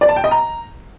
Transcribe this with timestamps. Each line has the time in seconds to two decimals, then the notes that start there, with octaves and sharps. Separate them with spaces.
0.01 D5
0.09 A5
0.16 G5
0.24 D#5
0.31 A#5